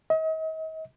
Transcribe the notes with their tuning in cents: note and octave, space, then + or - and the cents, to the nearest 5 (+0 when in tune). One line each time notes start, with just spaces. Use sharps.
D#5 +40